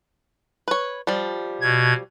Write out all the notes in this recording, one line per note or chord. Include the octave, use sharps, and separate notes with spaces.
B4 C#5
F3 G3
B2 G#6